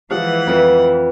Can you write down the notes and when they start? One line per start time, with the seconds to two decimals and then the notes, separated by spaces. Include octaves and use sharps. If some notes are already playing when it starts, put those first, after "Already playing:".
0.11 E3 F3 G#3 F#5
0.47 F2 B4